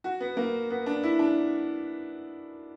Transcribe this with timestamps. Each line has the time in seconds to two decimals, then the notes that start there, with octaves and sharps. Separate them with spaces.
0.04 F#4
0.20 B3
0.37 A#3
0.70 B3
0.86 D4
1.03 E4
1.19 D4